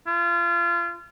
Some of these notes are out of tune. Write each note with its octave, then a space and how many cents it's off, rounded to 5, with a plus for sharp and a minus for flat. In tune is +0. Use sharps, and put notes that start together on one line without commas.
F4 -30